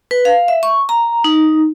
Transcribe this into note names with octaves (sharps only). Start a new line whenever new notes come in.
B4
F5
E5
C#6
A#5
D#4